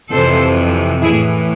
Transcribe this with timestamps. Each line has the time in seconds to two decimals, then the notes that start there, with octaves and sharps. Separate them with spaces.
0.11 F2 C3 E3 A4 C5
1.02 A2 E3 E4 G#4